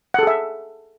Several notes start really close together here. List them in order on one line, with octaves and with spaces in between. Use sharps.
F#5 A4 G#4 E5